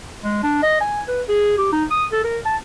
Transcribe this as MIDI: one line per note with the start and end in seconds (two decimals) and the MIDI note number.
0.24 0.40 56
0.43 0.60 62
0.63 0.79 75
0.81 1.02 80
1.08 1.22 71
1.28 1.58 68
1.58 1.72 67
1.73 1.85 63
1.91 2.05 87
2.12 2.23 69
2.24 2.38 70
2.45 2.57 81